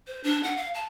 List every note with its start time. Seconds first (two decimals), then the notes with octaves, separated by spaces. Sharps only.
0.07 C5
0.24 D4
0.44 F#5
0.57 F5
0.74 A5